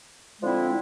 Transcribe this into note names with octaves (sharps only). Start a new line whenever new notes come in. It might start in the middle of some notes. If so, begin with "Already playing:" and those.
D3 F3 G#3 C4 E4